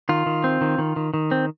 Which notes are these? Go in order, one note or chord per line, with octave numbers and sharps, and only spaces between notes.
D#3 F4
D#3
C4
D#3
D#3
D#3
D#3
C4